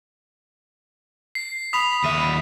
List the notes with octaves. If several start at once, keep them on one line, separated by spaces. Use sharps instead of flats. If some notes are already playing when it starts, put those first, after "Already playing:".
C7
B5 D#6 B6 F7
D#2 E5 D#7